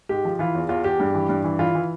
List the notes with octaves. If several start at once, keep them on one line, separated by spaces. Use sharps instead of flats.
G#2 G4
F3
E3 F4
E2
E2 F4
E2 G4
G2
E3
G2
E3
E3 F4
E3